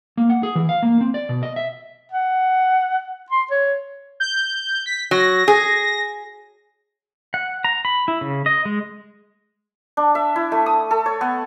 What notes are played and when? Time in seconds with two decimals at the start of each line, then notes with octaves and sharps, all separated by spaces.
0.17 A#3
0.30 F#5
0.43 G#4
0.55 E3
0.69 F5
0.83 A#3
1.01 C4
1.14 D5
1.29 B2
1.43 D#5
1.56 E5
2.11 F#5
3.30 C6
3.51 C#5
4.20 G6
4.86 B6
5.11 F#3 A#6
5.48 G#4
7.34 F#5
7.64 A#5
7.85 B5
8.08 E4
8.21 C#3
8.46 D#5
8.65 G#3
9.97 D4
10.15 E5
10.36 E4
10.52 A3
10.66 D#6
10.91 A4
11.06 C#5
11.21 B3